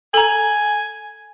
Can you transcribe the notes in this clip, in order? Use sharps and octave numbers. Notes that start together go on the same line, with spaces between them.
A4 G#5 A#5